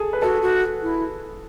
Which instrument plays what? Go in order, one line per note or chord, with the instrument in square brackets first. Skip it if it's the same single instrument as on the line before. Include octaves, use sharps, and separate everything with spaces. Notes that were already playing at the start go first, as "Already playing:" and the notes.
Already playing: [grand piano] G#4 A4
B4
[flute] F#4 [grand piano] A4
[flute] F#4
E4